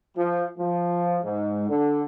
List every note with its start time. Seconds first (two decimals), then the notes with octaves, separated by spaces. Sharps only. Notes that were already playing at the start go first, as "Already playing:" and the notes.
0.16 F3
0.57 F3
1.22 G#2
1.68 D3